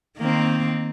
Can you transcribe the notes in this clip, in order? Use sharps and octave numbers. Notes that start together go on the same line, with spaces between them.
D#3 A#3 C4